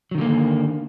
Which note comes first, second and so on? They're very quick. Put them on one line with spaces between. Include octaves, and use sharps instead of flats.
F#3 D#3 D3 A#3